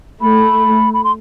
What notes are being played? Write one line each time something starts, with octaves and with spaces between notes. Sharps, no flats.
A3 B5
B5
C6